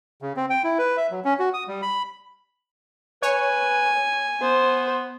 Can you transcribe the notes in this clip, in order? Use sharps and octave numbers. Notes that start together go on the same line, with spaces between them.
C#3
C4
G5
E4
B4
E5
F#3
C#4
F#4
D#6
G3
B5
B4 C#5 G#5
B3 C5